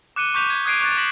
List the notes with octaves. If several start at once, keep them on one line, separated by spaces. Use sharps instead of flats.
D6 F#6 C#7 D#7 G7
C#6 D6 G6 B6 F7
G#6
D#6 F#6 G#6 C7 D7 D#7
C#6 F#6 A6
D6 F#6 A#6 B6 F#7